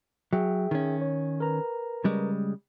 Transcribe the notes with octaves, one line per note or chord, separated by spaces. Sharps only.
F#3 G#4 E5 G5
D#3 C#4
C#5
A#4 B4 A#5
C#3 G3 G#3